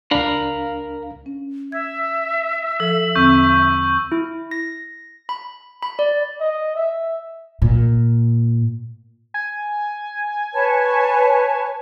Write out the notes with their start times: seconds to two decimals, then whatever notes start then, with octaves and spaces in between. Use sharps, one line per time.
0.11 C#2 D4 A#4 F5 B5
1.26 C#4
1.72 E5 G#6
2.80 F3 A4 E6
3.15 E2 D3 C4 C#6 G6
4.12 E4
4.51 A#6
5.29 B5
5.82 B5
5.99 D5
6.40 D#5
6.75 E5
7.62 A#2
9.34 G#5
10.53 B4 C#5 A5